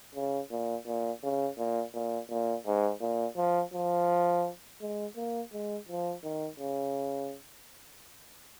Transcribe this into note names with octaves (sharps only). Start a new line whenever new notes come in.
C#3
A#2
A#2
C#3
A#2
A#2
A#2
G#2
A#2
F3
F3
G#3
A#3
G#3
F3
D#3
C#3